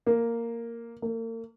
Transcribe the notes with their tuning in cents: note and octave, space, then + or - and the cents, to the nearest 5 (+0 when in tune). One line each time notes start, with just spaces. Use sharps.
A#3 -5
A#3 -40